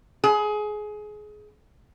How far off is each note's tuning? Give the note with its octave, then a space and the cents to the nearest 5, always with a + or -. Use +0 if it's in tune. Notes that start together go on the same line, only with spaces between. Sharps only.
G#4 +20